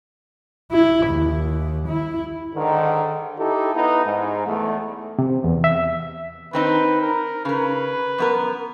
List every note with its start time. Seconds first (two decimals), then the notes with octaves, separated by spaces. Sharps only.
0.72 E4
1.07 D#2
1.88 E4
2.55 G#2 D3 D#3
3.39 D#4 E4 G4 A4
3.75 B3 D#4 E4 B4
4.05 G#2
4.46 E2 A3
5.19 C3
5.44 E2
5.64 E5
6.53 D#3 C4 D#4 B4
7.01 A#4
7.45 C#3 A#4 B4
8.18 F#2 B3 A#4